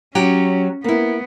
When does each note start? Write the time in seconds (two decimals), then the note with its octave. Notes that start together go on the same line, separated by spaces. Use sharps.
0.15 F#3 C#4 G4
0.84 A#3 B3 E4